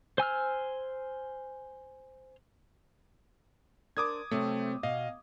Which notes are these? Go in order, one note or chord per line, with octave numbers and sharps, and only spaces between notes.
C5 G#5 E6 F6
D4 A#4 C5 D6 D#6 G#6
C3 F#3 A3 C4
B2 D#5 F5